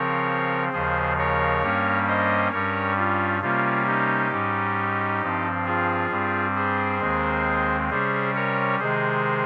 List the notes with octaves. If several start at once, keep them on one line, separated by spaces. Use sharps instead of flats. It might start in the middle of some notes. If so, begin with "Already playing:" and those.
Already playing: C#3 F3 C4 A#4 C#5
D#2 C#3 F3 G#4 C5
A#4 C#5
G2 G3 A#3 C#4
C5 D#5
G2 G3 C#4 A#4 C#5
F4
C3 G3 A#3 C#4 F4
D#4 G4
G#2 G3 C#4
G2 F3 C4
F4 G#4
G2 G3 C4
G#4 C5
D#2 D#3 G#3 C4
C3 G3 C#4 G#4 C5
A#4 C#5
C3 D#3 G#3 G#4 C5